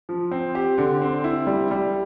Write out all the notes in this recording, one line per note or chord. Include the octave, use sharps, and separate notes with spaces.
F3
C4
G4
D3
C4
E4
G3
G3